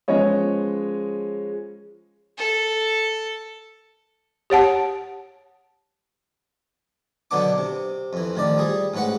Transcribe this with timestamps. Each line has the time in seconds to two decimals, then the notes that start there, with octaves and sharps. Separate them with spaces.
0.08 F3 G#3 B3 C#4 C#5 D#5
2.38 A4
4.50 G4 C#5 F#5 A5
7.31 B2 D3 F#3 B3 D4 D6
7.58 C3
8.13 F2 E3
8.35 A1 D#3 F3 D5
8.58 G3 G#4
8.94 A1 G#2 C#4 B4 F#5